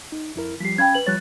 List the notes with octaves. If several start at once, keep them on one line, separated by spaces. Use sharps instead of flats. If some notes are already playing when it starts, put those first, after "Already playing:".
D#4
F2 E4 A#4
F3 G3 G4 B6 C7
C#4 F5 G5 B5 G#6
B4 F#7
F3 G3 C#5 F#6 A6